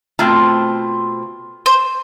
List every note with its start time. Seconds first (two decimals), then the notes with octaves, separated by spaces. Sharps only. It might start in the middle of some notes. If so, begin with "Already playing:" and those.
0.19 B2 A3 C4 F4 C5
1.66 C5